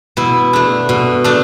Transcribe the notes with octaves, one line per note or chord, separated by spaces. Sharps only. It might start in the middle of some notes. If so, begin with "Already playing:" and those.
B2 E4
A3 D4
B2
A3 D4